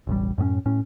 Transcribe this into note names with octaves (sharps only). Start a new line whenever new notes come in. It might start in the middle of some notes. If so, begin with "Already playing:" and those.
E1 A1 G3
F#2 A2 B3 C#4
A2 C#4